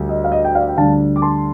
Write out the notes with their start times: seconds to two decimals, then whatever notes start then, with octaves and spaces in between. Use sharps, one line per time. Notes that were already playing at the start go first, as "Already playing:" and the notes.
Already playing: D2 D3 G3
0.09 D#5
0.24 F5
0.32 D#5
0.45 G5
0.55 D5 F5
0.69 G5
0.77 D2 D3 G3 D4 F5 A5
1.16 D6
1.22 A5 C6